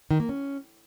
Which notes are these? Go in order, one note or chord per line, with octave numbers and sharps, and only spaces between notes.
D#3
A#3
C#4